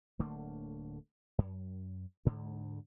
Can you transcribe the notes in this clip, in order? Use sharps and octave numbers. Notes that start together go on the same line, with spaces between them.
D1 D3 A3 A#3
F#2
D2 G#2 D3